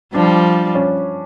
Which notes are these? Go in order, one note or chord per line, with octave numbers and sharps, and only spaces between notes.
F3 G3 D4
C#4